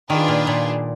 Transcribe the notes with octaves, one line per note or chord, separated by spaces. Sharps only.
D#3 D4 F4 G#4 B4
A#2
A#2